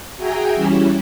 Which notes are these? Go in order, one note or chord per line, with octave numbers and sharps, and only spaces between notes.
F#4 G#4 E5 G5 G#5 A#5
E3 G3 C#4 E4